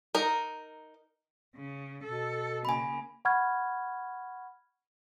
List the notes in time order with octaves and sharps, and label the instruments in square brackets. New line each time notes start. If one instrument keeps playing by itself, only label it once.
[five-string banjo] D#4 A#4
[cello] C#3
[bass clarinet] B2 [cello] A4
[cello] C#3 A#3 [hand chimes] G#5 B5
[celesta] F#5 B5 C#6 F6 G#6